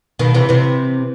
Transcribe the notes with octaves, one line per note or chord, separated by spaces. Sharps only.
B2 D#3
C3 E3
C3 E3